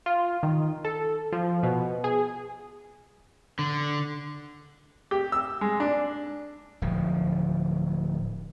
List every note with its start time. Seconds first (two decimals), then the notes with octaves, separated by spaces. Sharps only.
0.06 F4
0.43 D#3
0.85 A4
1.32 F3
1.63 B2
2.04 G#4
3.59 D3
5.11 G4
5.32 E6
5.61 G#3
5.80 D4
6.82 D1 F3